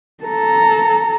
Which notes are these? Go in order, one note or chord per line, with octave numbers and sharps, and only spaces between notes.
A4 A#5